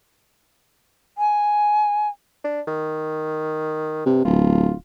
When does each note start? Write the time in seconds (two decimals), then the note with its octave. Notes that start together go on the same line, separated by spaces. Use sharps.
1.18 G#5
2.44 D4
2.67 D#3
4.06 G2 C3
4.25 D1 F4